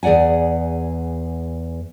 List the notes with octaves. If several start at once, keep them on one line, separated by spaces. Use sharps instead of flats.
E2 G#4 D5 F#5 G#5